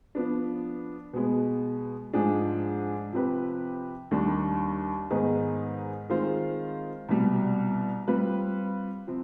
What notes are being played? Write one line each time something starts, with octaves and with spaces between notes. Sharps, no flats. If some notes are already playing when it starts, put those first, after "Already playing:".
F3 B3 D4
B2 G#3 B3
G#2 F3 G#3 D4 G#4
C3 F3 C4 G4 B4
D#2 D#3 G3 D4
G#2 D#3 B3 D#4 G#4
D#3 G#3 C4 F4 C5
C2 B2 G3
G3 C4 F4 B4
C3 F3 C4